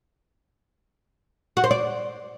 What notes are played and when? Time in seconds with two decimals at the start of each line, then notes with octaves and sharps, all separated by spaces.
1.57 F#4
1.64 C5
1.71 D5